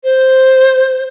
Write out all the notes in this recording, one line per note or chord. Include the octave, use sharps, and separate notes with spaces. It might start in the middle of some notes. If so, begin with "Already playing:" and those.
C5